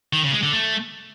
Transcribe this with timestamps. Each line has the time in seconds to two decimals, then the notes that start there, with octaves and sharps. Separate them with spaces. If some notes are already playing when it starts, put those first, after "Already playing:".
0.13 D#3
0.23 C#3
0.33 G#3
0.43 D3
0.53 A3